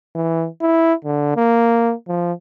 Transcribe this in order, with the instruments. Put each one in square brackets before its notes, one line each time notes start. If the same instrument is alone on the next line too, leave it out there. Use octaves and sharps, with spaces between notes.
[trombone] E3
E4
D3
A#3
F3